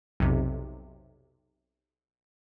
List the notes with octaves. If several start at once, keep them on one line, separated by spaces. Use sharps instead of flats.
B1 F2 C3